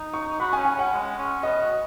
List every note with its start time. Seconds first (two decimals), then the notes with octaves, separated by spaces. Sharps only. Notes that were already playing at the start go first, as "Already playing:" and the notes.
Already playing: D#4
0.14 C#6
0.40 F#4 B5
0.53 G#5
0.57 C#4
0.65 G#5
0.75 C#4 F#5
0.92 G#3
1.17 C#4
1.43 B3 D#5
1.61 F#4